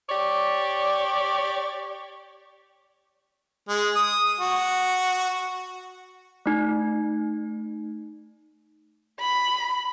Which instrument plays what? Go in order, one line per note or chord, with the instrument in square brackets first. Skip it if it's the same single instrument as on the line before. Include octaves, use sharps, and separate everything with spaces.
[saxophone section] G4 C#5 D5
[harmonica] G#3
D#6
F#4
[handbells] A3 D#4
[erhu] B5